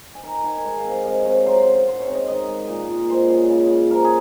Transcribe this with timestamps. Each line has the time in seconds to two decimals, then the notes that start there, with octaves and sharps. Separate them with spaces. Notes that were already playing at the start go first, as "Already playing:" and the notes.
0.15 G#5
0.23 D#3 A#5
0.44 D#3 G#5
0.58 G#5
0.64 G#3 F#5
0.78 F5
0.85 C4
0.92 F5
1.05 C3 D#5
1.26 C3 C#5
1.46 F#3 C5
1.60 C5
1.67 C#4
1.73 C5
1.87 G#2 C5
2.01 C#5
2.07 C4
2.14 D#5
2.28 D#3 D#5
2.48 G#3
2.68 A#2
2.89 A#2
3.09 G#3 C5
3.30 C#4
3.50 C#3
3.70 C#3
3.91 F3 A#4
4.04 G#4